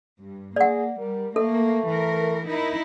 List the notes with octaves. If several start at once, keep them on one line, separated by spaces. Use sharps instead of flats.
G2
A#3 G#4 D5 F#5
G3 A#4
A3 A#3 A4
E3 A#4
D#4 E4 A#4